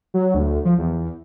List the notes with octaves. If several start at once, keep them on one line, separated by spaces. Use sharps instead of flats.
F#3
D2
F3
E2